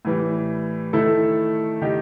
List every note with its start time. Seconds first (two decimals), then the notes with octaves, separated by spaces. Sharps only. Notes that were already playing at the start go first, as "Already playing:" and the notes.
0.05 A2 E3 G3
0.93 D#3 A3 E4 A4
1.82 D#3 G3 D#4 G4